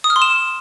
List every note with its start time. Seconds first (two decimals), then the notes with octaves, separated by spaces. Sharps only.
0.04 D#6
0.10 F6
0.16 C6
0.22 E7